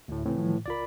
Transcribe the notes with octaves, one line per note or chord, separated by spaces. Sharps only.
D2 A2
A2 C#3 E3 C4
D#3 F3 G3
C#2 F4 A#4 D5 B5